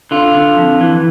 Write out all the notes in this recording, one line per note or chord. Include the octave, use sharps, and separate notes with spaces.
D3 F4
D3
F2
E3